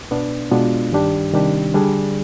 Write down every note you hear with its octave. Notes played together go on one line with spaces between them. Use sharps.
B2 B3 D4
B2 G#3 B3 D4 F4
G2 D#3 G3 D4 G4
C3 D#3 G3 D4 G4
D3 G3 D4 G#4